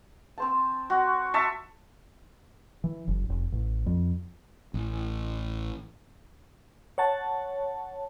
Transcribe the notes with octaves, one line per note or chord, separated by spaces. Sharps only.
C4 C5 A5
F#4
E5 A5 C#6
E3
F#1
F1
A1
F2
A1
C#5 F#5 A5